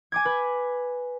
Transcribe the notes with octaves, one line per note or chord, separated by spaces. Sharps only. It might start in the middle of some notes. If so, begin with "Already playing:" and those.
G#5 D6 G#6
B4